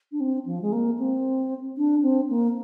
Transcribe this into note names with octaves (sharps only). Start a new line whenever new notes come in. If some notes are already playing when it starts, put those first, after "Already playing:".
D4
C4
F3
G#3
A#3
C4
D4
C4
A#3